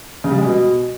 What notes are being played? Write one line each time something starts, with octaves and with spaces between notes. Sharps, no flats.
C#3
G3
G#3
B2